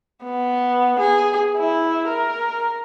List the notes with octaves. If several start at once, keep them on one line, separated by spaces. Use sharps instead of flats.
B3
G#4
E4
A#4